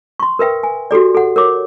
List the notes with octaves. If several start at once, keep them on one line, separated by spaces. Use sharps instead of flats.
C6 C#6
A#4 B4 E5 G5
G#5
F#4 G4 A4 D5
A4 F#5
A#4 C#5 D6